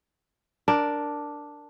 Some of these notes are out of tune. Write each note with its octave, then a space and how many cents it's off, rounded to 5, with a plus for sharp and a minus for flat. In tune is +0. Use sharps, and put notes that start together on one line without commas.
D4 +0 A#4 +0